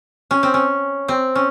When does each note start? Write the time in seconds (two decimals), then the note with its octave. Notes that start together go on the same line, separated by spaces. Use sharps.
0.31 C#4
0.43 C4
0.54 C#4
1.08 C4
1.35 C#4